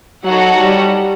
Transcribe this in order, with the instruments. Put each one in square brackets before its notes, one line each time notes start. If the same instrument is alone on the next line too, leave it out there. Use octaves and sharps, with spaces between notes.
[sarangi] F#3 [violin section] D#4 F#4 A4 C#5 F#5
[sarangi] G3